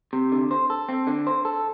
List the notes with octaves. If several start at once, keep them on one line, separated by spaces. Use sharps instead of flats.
C3
D3
C5
A4
C4
D3
C5
A4